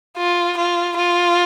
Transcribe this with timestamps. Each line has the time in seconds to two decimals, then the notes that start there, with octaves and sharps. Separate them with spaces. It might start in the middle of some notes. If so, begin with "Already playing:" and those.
0.17 F4
0.57 F4
0.96 F4